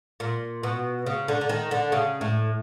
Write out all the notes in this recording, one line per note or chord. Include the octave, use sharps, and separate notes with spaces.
A#2
B2
C#3
D3
D3
D#3
D3
C#3
A2